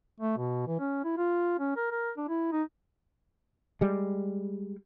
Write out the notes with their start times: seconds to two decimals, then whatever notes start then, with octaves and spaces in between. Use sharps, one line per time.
0.20 A3
0.38 B2
0.67 E3
0.79 C#4
1.04 E4
1.17 F4
1.59 C#4
1.76 A#4
1.91 A#4
2.17 D4
2.28 E4
2.52 D#4
3.81 G3 G#3